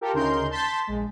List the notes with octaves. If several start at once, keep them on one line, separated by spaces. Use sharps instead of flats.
F4 G4 A4 A#4
D2 C#3 D#4 A#4 C6 G6
A5 C6 G6 A6 B6
A#1 G#3